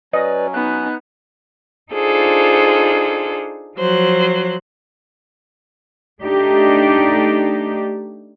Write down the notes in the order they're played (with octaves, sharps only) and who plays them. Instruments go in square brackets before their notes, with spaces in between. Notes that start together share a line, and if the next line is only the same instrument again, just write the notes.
[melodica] F#3 C#4 [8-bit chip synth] B4 D5 [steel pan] D#5
[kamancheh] B3 D#4 [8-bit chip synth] F#6
[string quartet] D4 D#4 F4 G#4 A4 C5
F3 F#3 C5 F#6
[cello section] A3 D4 D#4 G4